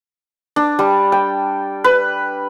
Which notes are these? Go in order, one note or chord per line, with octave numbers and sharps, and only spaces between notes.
D4
G3
G5
B4